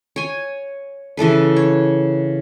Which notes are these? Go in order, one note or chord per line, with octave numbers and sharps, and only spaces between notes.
C#5 G#5
C#3 E3 A4 B4
C#5